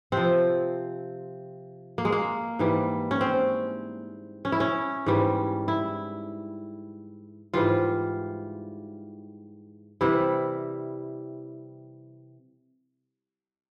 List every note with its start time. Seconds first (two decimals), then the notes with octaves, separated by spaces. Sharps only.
0.12 C3 F3 C4
1.98 A#3
2.05 G#3
2.12 A#3
2.59 G#2 E3 G3
3.11 C#4
3.21 C4
4.45 C#4
4.52 E4
4.60 C#4
5.06 G#2 E3 G3
5.68 E4
7.54 G#2 E3 G3 F4
10.01 C3 E3 G3 E4